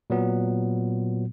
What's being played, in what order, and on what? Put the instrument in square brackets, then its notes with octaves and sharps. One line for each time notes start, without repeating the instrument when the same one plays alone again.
[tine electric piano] A#2 F#3 B3